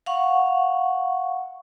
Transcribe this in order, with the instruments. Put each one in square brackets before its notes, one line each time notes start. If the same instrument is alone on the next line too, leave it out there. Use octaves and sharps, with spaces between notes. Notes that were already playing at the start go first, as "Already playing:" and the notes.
[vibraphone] F5 F#5 C#6